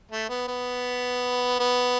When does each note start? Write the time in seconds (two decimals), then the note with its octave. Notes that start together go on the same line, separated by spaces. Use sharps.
0.11 A3
0.29 B3
0.48 B3
1.60 B3